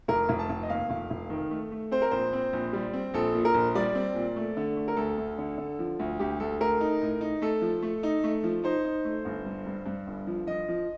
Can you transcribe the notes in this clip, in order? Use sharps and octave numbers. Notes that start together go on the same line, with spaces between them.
F1 A#4
F1
A5
F1
D#5
D#2 F5
F1
F1
D#3
A3
A3
C4 C5
A#4
A#1 C5
C4
A#1
G3
C4
A#1 A4
A#2
A#4
A#1
G3 D5
C4
A#2
A3
D3
A3
A#4
D2 A4
D2
D3
D3
F3
D2
D2 G4
D2 A4
A3 A#4
D#4
A2
D#4
A3 A4
F3
A3
D#4
A3
F3
D#4 C5
D#4
A3
G1
G2
G2
G2
G1
F3
F3 D#5
F3